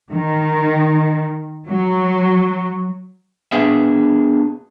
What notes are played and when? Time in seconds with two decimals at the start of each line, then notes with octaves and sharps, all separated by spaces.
0.10 D#3
1.66 F#3
3.52 B3 D4 G#4 E5